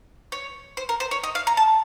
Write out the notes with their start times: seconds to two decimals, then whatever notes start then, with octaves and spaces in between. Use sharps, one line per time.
0.32 C#5
0.77 C5
0.89 A#4
1.00 C5
1.11 C#5
1.23 D#5
1.35 F5
1.47 A#5
1.57 A5